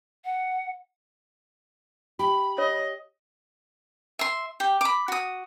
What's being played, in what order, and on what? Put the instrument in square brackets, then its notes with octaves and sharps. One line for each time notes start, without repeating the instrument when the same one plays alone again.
[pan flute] F#5
[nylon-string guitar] G4 [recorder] B5
[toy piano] C#5 [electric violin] D#5
[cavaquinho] E5 C6
G4
B5 D6
F#4 D#6